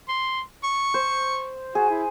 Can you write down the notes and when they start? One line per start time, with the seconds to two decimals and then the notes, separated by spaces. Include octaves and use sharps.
0.08 C6
0.63 C#6
0.94 C5
1.75 F#4 G#4
1.90 E4